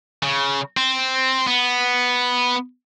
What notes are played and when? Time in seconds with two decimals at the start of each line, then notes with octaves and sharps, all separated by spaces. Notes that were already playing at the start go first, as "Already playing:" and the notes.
0.23 C#3
0.77 C4
1.47 B3